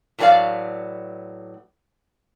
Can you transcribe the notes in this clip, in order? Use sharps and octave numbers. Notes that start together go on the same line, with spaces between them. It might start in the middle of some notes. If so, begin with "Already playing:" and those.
A2 E3 F#3 C4 D5 F5